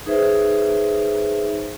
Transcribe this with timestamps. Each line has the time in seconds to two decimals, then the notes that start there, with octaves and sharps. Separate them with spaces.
0.06 D#4 G#4 B4 C5 E5